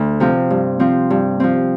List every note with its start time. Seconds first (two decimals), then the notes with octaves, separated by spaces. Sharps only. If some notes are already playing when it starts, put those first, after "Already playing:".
Already playing: D2
0.20 C3 F3 C4
0.50 G2
0.79 F3 C4
1.10 G2
1.40 F3 C4